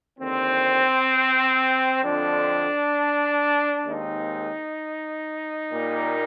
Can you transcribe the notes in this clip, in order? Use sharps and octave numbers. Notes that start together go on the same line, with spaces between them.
D#2 D3 F3 C4
F2 D3 F3 C4 D4
D#2 D#3 G#3 C4 D#4
A#2 G3 A#3